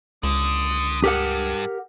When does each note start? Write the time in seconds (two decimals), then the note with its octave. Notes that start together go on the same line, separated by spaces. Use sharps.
0.23 C#2 D3 D#6
1.04 G2 G4 A#4 F#5